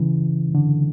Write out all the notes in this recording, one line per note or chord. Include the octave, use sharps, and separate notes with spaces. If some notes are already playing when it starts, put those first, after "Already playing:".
Already playing: C#3 E3
D3